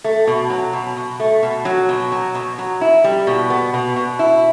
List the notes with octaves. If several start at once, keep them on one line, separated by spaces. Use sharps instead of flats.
A3
B2
F#3
B2
B2
A3
B2
F#3
B2
F#3
B2
F#3
E4
G3
B2
B3
B2
B2
E4